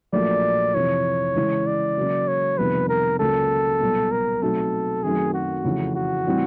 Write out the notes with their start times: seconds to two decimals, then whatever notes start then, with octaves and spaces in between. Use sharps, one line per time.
0.13 A#1 A#2 F#3 A3 D5
0.74 F2 C3 E3 C#5
1.36 C#3 E3 G#3 C#4 E4
1.67 D5
1.97 C#3 F#3 A#3
2.27 C#5
2.58 F2 C3 D#3 G3 B3 B4
2.89 A#4
3.19 C#2 C#3 F#3 A#3 C#4 A4
3.80 B1 A#2 G3 B3
4.11 A#4
4.42 B2 F#3 A3 C4 D#4 A4
5.03 F#2 D#3 F#3 A3 C4 G#4
5.34 F#4
5.64 F2 C#3 E3 A3
5.95 F#4
6.26 A2 E3 G3 C4